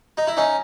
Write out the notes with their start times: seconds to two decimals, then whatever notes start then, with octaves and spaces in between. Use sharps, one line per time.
0.17 D#4
0.27 E4
0.37 C#4 D#4